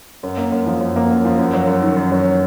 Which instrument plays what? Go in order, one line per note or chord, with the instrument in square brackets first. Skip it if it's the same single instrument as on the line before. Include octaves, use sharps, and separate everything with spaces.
[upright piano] F#2
A#3
F#2
F3
F#2
A#3
F#2
F3
F#2
F#3
F#2
D#3
F#2
F#3